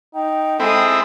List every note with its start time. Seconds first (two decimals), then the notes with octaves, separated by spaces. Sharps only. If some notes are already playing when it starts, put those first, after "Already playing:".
0.15 D#4 G5
0.60 G#3 C4 E4 A4 D#6